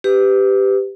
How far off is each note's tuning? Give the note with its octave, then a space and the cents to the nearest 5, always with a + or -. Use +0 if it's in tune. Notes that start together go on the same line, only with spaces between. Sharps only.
G4 +0 B4 +25